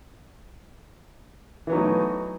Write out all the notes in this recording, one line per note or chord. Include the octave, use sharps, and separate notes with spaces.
E3 F#3 A3 B3 D#4